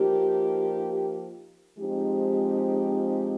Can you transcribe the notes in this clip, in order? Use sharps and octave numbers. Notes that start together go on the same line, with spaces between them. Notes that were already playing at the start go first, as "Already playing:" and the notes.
Already playing: F3 A#3 D#4 G4
F3 G#3 C4 D#4 G4